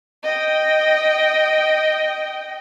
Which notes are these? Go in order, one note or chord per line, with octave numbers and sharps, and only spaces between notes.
D#5 G5